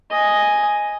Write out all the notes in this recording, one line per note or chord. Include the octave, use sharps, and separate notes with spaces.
D#5 G#5